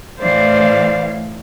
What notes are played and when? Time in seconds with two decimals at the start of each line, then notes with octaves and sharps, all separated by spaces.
0.20 A2 E3 C5 D5 F5